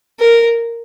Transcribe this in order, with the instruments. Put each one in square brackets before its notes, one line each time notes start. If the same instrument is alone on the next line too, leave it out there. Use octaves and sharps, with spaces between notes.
[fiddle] A#4